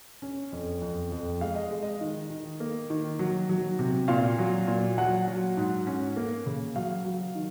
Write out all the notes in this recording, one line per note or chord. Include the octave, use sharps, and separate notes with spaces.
C#4
F2
F2
F2
G#3 F5
D#5
G#3
D#5
D#3
D#3
A#3
D#3
F#3
F#3
C3
A#2 F5
F#3
A#2
F#3 F#5
F#3
G#2
C#4
A#3
C#3
F#3 F5
F#3
D#3